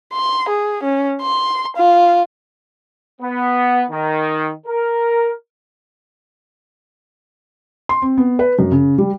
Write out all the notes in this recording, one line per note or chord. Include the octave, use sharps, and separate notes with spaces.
C6
G#4
C#4
C6
F4
B3
D#3
A#4
C6
C4
B3
B4
F#2
C#3
G3